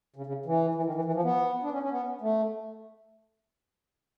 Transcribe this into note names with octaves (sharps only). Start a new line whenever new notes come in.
C#3
C#3
E3
E3
D#3
E3
E3
F3
B3
D4
C#4
C#4
B3
A3